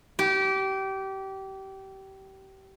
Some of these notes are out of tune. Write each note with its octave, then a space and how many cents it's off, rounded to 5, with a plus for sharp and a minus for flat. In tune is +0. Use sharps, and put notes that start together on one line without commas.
G4 -25